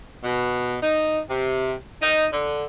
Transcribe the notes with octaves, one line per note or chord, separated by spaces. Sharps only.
B2
D#4
C3
D#4
D3